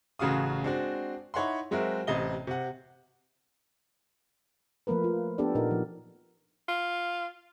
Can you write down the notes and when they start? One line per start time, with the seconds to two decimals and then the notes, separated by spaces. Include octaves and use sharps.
0.19 A1 C#3 F#4 F5 D#6
0.63 G#3 C4 D4 F#4
1.34 D#4 E4 C#5 F#5 B5 C6
1.71 F#3 G#3 C4 F#4 A#4 E5
2.07 A1 C3 D#5 G7
2.47 C3 F#5
4.87 F3 A3 A#3 A#4 B4
5.04 F4
5.38 B3 D4 G4 A4 D5
5.55 A#2 D#4 A#4
5.71 F3
6.69 F4